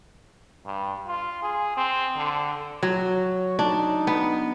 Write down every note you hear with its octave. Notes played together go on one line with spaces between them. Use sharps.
G2
F4
G#4
C4
D3
F#3 C#5
D4 D#4
B3